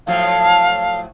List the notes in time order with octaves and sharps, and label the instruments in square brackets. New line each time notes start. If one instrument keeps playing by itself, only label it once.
[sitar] A2 F3 F#3 [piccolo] F5